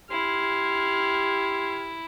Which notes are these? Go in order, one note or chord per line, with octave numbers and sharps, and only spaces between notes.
E4 G4 C6 F6 G#6